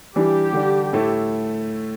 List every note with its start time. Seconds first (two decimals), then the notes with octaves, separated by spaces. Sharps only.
0.15 E3 G3 D4 G4
0.53 D3 G3 D4
0.93 A2 A3 E4